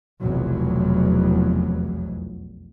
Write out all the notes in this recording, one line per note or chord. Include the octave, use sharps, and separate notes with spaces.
F1 B1 E2 F#3